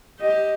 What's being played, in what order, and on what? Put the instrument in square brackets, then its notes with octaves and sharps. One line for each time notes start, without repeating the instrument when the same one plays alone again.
[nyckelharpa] G4 [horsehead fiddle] D#5